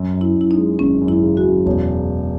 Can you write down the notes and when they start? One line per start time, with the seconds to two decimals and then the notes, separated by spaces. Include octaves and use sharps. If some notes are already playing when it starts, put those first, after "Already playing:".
Already playing: F#2
0.14 F#2
0.21 E4
0.36 F#2 E4
0.51 D#4
0.58 G#3
0.79 G#1 C#4
1.01 F#2
1.08 E4
1.23 C#3
1.37 F#4
1.45 F#2
1.66 E1 C#5